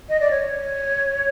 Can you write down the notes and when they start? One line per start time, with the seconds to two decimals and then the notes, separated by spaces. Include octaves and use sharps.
0.09 D#5
0.20 D5
0.31 C#5